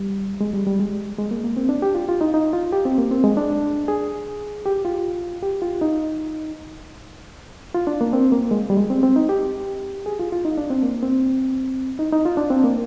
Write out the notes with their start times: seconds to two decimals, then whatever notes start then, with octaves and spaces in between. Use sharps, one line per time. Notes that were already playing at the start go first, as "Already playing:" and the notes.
Already playing: G3
0.41 G#3
0.54 G3
0.67 G3
0.79 G#3
1.18 G#3
1.31 A#3
1.44 A#3
1.57 C4
1.69 D4
1.82 G4
1.95 F4
2.08 F4
2.21 D#4
2.34 D#4
2.53 F4
2.73 G4
2.85 C4
2.98 A#3
3.11 C4
3.24 G#3
3.37 D4
3.88 G#4
4.66 G4
4.85 F4
5.43 G4
5.62 F4
5.81 D#4
7.75 F4
7.87 D4
8.01 A#3
8.13 C4
8.32 A#3
8.51 G#3
8.70 G3
8.77 G#3
8.90 C4
9.03 C4
9.16 D#4
9.29 G4
10.06 G#4
10.19 F4
10.32 F4
10.45 D#4
10.58 D4
10.70 C4
10.83 A#3
11.03 C4
11.99 D#4
12.13 D#4
12.25 F4
12.37 D4
12.50 C4
12.64 A#3